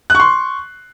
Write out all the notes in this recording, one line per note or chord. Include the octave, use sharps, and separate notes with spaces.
C6 C#6 F#6